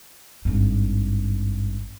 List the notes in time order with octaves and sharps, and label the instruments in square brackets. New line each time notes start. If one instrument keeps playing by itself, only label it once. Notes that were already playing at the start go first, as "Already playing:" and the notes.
[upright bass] G#1 G2